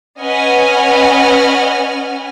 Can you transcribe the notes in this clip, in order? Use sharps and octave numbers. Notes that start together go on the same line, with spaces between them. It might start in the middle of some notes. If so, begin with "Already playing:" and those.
C#4 B4 D#5 F#5 G#5 F6